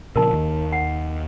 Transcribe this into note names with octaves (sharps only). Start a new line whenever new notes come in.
A#2 C#3 F3 A#4 A5
D#2 D#3
F#5